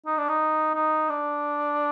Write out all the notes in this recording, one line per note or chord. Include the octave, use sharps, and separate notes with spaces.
D#4
D4
D#4
D#4
D4